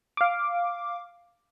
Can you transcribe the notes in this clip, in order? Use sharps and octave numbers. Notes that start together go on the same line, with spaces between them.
F5 D6